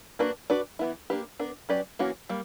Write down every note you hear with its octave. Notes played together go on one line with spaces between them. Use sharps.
A#3 D4 F#4 B4
D4 F#4 B4 D5
E3 B3 E4
A#3 D4 G4 B4
B3 D4 A#4
F#3 C#4 G4 B4 D5
E3 A#3 C#4 F#4
G3 A#3